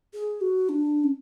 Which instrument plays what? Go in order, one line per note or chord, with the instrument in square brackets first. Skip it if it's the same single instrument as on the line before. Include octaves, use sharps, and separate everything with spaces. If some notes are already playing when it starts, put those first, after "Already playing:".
[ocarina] G#4
F#4
D4
C#4